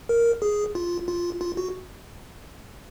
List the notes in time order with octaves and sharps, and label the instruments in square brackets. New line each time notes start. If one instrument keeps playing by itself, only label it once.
[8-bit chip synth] A#4
G#4
F4
F4
F4
F#4